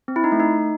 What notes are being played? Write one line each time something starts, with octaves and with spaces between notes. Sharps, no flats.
C4
E4
D#4
A3
D#4